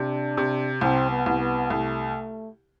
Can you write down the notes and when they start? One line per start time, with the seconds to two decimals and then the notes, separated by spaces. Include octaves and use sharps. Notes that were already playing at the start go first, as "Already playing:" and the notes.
Already playing: C3 D4
0.37 C3
0.81 C2 C4
1.11 B3
1.26 C2
1.40 B3
1.70 C2 A3